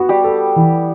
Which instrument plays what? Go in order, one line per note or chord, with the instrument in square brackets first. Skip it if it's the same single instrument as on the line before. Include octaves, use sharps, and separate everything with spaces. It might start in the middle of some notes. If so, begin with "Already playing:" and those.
Already playing: [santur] B3 [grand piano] F#4
[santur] G3 G4
[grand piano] A4
E3